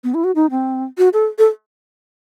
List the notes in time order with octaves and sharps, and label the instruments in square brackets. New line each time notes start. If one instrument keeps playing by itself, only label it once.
[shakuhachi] B3
E4
F#4
D#4
C4
F#4
A4
A4